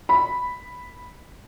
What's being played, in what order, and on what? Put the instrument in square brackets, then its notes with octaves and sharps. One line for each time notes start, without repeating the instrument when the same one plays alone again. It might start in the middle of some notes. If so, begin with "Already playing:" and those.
[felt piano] B5